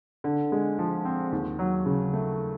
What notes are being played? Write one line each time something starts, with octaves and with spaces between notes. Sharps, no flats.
D3
G#3
F3
C4
D#2
F#3
C#3
A3